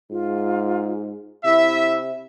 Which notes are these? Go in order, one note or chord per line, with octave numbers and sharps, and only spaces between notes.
G#2 F4
C3 E4 E5